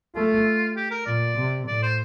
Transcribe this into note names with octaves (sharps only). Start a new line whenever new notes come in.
A3 F4
G4
A#4
A#2 D5
C3
A2 D5
C5